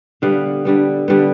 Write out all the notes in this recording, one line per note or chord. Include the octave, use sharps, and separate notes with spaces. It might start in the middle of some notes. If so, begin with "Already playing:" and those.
D3 G3 B3 F5
D3 G3 B3
D3 G3 B3